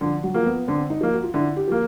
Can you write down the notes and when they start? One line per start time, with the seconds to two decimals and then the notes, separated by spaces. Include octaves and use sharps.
0.01 D3 F3
0.23 F#3
0.34 F3 A#3
0.46 B3
0.68 D3 C4
0.90 D#4
1.01 F3 A#3
1.13 F#4
1.24 F4
1.34 D3 E4
1.56 G4
1.68 F3 A#3